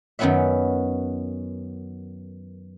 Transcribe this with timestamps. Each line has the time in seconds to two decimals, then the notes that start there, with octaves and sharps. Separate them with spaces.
0.19 F#2 D#3 B3 C#4 F#4 E5